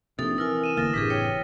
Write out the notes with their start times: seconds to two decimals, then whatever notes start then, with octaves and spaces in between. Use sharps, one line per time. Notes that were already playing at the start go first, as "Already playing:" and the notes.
0.19 A#1 C3 D#4 A4 D#6
0.38 E3 A#4 G#5 E6 F6
0.64 D#7 E7
0.77 F1 D3 A#3 F6 A6 A#6
0.94 F#1 A2 C3 D4 G4 G#4 B6
1.10 C#5 G5